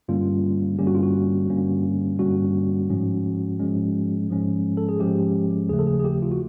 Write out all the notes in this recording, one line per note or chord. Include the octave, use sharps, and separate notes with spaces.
G2 D3 G3 A#3 C#4 F4
G2 D3 G3 A#3 C#4 G4
F#4
F4
F#4
G2 D3 G3 A#3 C#4
G2 D3 G3 A#3 C#4 F#4
G#2 F3 G#3 C#4
G#2 F3 G#3 C#4
G#2 F3 G#3 C#4
A4
G#4
G#2 F3 G#3 C#4 G4
D#2 C#3 F3 A3 G#4
A4
G#4
G#4
G4
F4
F#4